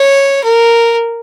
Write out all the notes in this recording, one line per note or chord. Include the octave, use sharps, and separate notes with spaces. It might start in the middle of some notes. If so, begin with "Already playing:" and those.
Already playing: C#5
A#4